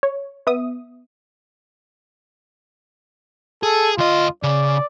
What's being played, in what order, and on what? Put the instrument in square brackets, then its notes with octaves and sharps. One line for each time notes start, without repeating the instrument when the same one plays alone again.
[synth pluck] C#5
B3 E5 D#6
[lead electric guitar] G#4 [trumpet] A4
[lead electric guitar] D2 D#5 [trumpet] F4
[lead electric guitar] C#3 [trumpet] D5